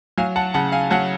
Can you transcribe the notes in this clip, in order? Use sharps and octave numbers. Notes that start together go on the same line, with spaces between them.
F#3 F5 G#5
F#5 A5
C#3 F#5 A5
F5 G#5
F#3 F#5 A5